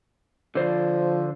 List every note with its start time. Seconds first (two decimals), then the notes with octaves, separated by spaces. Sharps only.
0.55 D3 F3 C5 D5